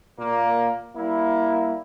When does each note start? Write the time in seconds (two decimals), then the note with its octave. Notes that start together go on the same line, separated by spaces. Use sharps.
0.18 A#2 A#3
0.96 G3 A#3 E4